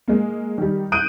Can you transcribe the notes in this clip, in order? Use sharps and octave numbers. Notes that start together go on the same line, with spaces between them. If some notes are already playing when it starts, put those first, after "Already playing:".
G#3 A#3
D#3 G3
D#6 F#6 G6 D7 D#7